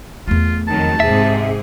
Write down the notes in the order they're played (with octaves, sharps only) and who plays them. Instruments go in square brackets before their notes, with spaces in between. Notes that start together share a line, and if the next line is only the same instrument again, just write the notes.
[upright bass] E2 A3 [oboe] F4
[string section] F2 D#3 F#3 [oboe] A5
[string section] G#2 C3 G#4 [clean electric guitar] E5